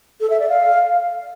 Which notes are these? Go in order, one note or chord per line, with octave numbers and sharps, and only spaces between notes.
A4
E5
D5
F5